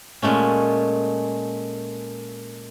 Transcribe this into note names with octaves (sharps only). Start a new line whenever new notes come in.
A#2 G#3 A3 C#4